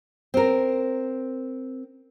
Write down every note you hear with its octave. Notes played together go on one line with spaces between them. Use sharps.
C4 A#4